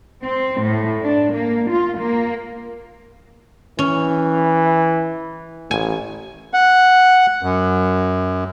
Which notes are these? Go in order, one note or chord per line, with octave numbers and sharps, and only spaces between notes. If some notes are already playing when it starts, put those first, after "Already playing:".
C4
A2
D4
A#3
F4
A#3
E3 C#4
A1 G#5
F#5
F#2